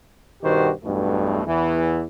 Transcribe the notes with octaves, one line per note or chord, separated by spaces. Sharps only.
G2 B2 D#3 F#4 G4 C5
B1 E2 G2 B2 A3
E2 E3